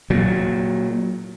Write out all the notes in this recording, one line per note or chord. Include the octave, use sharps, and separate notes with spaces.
A#2 F#3